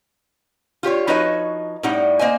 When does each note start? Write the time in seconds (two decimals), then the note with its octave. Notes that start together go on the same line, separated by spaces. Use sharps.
0.83 F4 G4 C5 C#5
1.07 F3 D#4 F#4 B4 C#5 D#5
1.83 A2 G3 D#4 F#5
2.19 A#3 C5 D#5 G#5